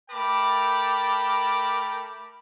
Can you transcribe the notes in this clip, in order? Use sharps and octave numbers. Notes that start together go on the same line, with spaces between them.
A3 A#4 G5 A5 B5 D6